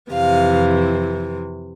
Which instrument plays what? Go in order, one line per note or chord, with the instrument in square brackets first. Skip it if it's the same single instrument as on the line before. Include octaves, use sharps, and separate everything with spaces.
[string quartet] F2 C3 E3 F5